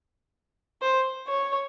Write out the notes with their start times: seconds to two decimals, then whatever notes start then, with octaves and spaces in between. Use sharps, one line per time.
0.82 C5
1.28 C#5